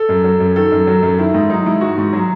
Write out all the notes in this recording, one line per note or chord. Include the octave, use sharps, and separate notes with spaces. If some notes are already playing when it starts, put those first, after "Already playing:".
Already playing: A4
F#2
F#3
F#2
D#3 A4
F#2
F#3
F#2
D#3 E4
G#2
F#3 D#4
G#2 E4
D#3 F#4
G#2
F#3